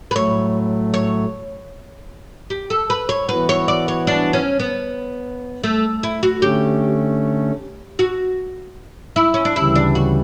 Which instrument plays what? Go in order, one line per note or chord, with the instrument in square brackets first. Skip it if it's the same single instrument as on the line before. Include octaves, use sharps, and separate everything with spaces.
[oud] B4
[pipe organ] A2 F#3 A3 [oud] C#5
[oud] C#5
G4
A4
B4
C#5
[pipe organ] E3 B3 F#4 [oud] B4
[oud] C#5
D5
C#5
D4
C#4
B3
A3
E4
F#4
[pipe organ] D3 A3 C#4 [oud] G4
[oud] F#4
E4
C#4
D4
[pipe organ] D2 C#3 E3 G3 [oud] E4
[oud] D4
F#4